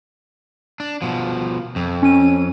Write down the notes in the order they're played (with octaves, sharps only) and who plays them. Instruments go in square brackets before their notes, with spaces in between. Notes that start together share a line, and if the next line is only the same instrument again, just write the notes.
[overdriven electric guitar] D4
B2 F3
F2
[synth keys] C#4 D#7